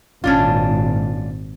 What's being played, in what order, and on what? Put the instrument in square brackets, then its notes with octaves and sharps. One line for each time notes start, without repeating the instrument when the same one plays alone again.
[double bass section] G#1 A#2 [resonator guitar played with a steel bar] C#4 D4 F4